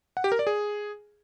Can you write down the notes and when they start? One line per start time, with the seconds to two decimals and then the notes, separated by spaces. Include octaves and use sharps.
0.17 F#5
0.24 G4
0.32 A#4
0.39 D5
0.47 G#4